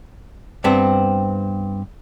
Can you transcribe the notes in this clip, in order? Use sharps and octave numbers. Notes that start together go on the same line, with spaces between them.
G2 B3 C4